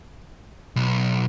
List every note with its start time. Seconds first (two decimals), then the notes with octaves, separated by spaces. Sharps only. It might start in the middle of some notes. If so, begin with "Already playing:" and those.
0.76 B1